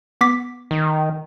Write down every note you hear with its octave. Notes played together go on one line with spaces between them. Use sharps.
B3 D6 B6
D#3